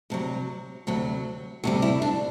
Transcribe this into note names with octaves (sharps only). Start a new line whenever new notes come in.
D2 C3 F#3
D2 C3 F#3
D2 C3 G3 F#4
E4
D4